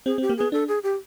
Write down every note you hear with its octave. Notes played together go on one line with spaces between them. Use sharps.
C4 G#4
C4
G4
A#3
B3 G#4
D4 A4
G#4
G4